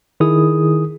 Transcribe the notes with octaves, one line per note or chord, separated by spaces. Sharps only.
D#3 E4 G#4 D#6